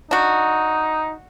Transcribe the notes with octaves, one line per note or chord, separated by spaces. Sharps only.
D4 D#4 F#4